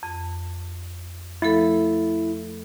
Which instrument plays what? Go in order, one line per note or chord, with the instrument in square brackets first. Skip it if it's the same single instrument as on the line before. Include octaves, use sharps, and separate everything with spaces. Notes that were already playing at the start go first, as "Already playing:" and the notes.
[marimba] F2
[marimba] F3 A3 A4 [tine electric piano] E4